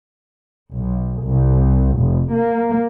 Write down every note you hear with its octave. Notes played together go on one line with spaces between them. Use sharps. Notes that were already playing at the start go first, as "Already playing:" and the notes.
B1
C2
F1
A#3